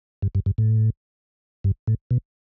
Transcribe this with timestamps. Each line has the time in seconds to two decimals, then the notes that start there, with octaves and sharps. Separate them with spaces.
0.22 G2
0.35 G2
0.46 G2
0.58 A2
1.64 G2
1.87 A2
2.11 B2